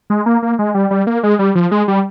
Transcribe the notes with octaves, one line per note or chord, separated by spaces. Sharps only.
G#3
A#3
A#3
G#3
G3
G3
A#3
G#3
G3
F3
G#3
G3